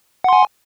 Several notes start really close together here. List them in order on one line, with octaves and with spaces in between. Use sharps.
F#5 C6 G#5